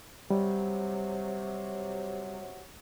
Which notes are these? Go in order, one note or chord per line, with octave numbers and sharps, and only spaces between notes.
C3 F#3 G3